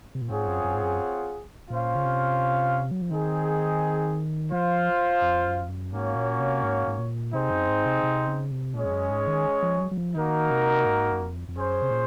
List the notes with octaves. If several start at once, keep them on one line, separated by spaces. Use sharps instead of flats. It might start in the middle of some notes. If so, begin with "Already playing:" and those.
C3
A#2
G#2 C4 F4 G#4 C#5 F#5
F#2
F#2
G#2
F#2
A#2 C#4 F4 C5 F5
C#3
C3
F#3
F3
D#3 C4 D#4 G#4
F3 F4 C5 F5
F2
F#2
F2
F#2
G#2 A#3 C#4 F#4 C#5 F5
A#2
C3
G#2
G#2
A#2
C3 C4 D#4 G#4 C5
F#2
G#2
C3
C3
C#3
C3
A#2 G#3 C#4 G#4 C#5
F2
F#2
G#2
D#3
F3
F#3
F#3
F3
D#3 A#3 D#4 F#4 A#4
C3
G#2
F#2
F2
F2
F#2 C#4 G#4 C5
C3
A#2